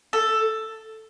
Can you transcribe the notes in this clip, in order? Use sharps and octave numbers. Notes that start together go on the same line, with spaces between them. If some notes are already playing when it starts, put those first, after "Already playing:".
A4